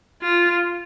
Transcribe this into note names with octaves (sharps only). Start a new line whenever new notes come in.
F4